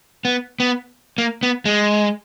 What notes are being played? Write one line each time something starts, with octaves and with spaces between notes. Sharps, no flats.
B3
B3
A#3
B3
G#3